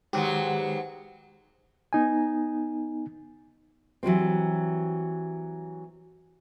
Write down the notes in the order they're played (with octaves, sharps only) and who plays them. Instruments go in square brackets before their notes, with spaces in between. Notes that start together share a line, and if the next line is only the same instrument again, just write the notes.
[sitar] G#2 F#3 B3 [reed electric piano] D#3 G#3 [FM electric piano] G4
[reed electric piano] B3 D#4 G#5
[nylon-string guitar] E3 F#3 G3 C4